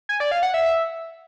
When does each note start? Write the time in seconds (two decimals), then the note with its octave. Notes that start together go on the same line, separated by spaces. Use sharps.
0.09 G#5
0.20 D5
0.31 F5
0.43 F#5
0.54 E5